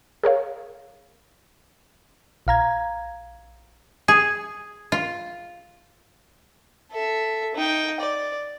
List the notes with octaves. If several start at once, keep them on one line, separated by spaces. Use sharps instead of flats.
G#4 A#4 C#5 F5
A#1 F5 A#5 G#6
G#4
F4
A4 E5
D#4 G5
D5